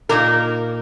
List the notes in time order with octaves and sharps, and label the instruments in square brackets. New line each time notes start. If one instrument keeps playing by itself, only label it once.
[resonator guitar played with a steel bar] A#2 A#3 D#4 A#4